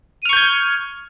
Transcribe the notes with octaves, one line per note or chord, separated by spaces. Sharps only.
C#6 F6 G6 G#6 D#7